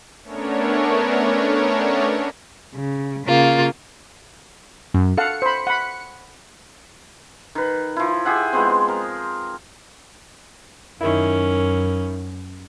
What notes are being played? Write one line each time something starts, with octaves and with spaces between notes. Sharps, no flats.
A3 B3 C#4 D4 A#4 C#5
C#3
C#3 A#3 F4
F#2
A4 F5 F#5 C#7
C5 B5
F#5 B5
D#3 B4
F3 E4
G4 G#4 E5 F#5
F3 G#3 B3 C4
A#4
F#2 D#3 C#4 E4 A#4